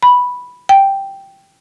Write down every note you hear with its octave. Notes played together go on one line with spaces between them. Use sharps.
B5
G5